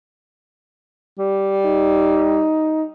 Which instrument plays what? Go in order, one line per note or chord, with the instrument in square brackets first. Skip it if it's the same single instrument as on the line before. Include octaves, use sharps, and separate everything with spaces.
[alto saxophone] G3
[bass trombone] D#4